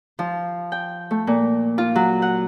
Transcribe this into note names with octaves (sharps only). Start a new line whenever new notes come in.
F3
G5
A3
A#2
F4
F#3
F#5